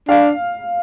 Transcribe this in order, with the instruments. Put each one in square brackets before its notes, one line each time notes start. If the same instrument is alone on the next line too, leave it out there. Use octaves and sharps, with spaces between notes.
[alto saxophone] D4 [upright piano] F5